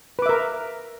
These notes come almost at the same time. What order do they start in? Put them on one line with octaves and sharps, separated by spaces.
B4 D6 E5 A#4